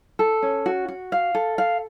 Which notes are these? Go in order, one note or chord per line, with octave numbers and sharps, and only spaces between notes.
A4
C#4
F#4
F#4
F5
A4
F5